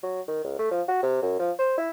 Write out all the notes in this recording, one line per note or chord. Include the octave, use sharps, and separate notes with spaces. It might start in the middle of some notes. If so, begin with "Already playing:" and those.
F#3
D#3
C#2
A3
F3
F#4
C3
F#2
F3
C5
E4